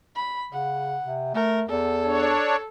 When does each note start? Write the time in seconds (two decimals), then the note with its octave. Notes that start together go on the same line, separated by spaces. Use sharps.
0.16 B5
0.52 C#3 F#5
1.04 C3
1.34 A3 A#4
1.69 E2 A4
2.05 D4 C#5